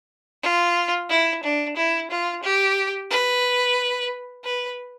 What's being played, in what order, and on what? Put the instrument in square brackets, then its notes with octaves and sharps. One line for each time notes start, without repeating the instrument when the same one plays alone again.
[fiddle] F4
E4
D4
E4
F4
G4
B4
B4